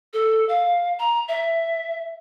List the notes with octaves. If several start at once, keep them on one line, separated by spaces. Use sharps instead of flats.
A4
F5
A#5
E5